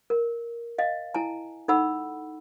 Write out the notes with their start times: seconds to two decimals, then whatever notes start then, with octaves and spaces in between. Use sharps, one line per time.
0.10 A#4
0.78 D#5 F5
1.14 E4 G#5 A5
1.68 D#4 A4 F#5 B5 E6